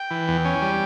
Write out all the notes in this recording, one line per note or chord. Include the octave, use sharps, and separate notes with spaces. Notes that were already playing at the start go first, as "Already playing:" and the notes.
Already playing: G5
E3
E2
C#4
G3